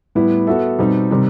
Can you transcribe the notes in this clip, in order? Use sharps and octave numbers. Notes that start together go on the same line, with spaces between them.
A2 G3 B3 E4
B3 F#4 A4 E5
B2 G3 C4 D#4
C3 D#3 G3 C4 D#4